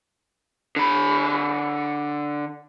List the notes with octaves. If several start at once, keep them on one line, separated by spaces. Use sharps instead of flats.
D3 B5